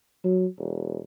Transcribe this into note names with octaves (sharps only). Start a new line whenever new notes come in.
F#3
E1